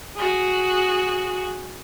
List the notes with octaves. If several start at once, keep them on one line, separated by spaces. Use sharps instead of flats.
F#4 G#4